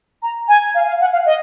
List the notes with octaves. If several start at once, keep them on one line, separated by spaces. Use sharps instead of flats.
A#5
G#5
F5
F5
F#5
F5
D#5